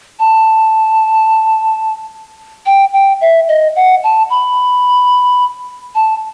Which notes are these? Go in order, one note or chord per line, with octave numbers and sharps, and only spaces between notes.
A5
G5
G5
E5
D#5
F#5
A5
B5
A5